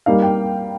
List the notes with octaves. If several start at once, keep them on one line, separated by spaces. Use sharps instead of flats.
G3 A#3 D#4 F5
G5